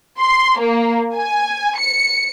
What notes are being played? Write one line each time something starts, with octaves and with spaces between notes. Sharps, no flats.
C6
A#3
G#5
C#7